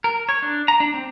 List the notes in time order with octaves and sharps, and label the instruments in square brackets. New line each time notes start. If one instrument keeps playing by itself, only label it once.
[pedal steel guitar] A#4
C#5
D4
A#5
D4
C4